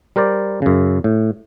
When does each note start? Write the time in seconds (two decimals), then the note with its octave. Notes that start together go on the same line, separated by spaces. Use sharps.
0.16 G3 A#4 C5 D5
0.62 F#2 C#3
1.04 A2